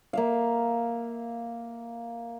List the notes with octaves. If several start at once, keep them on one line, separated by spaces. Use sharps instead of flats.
A#3 E5 F5